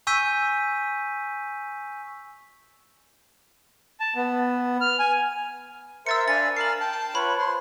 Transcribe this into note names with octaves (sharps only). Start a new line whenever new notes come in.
G#5 C#6 E6 G6 B6 D#7
A5
B3
F6
G#5
A#4 C5 E5 E6 A6 C#7
D4 F5 G#5 B5 A6
A#4 A5 F6 C7 F#7
G5 A5
F4 B4 C#5 B5
C5 C6